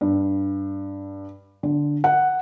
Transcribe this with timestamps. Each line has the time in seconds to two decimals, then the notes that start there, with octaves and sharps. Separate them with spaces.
0.01 G2
1.63 D3
2.04 F#5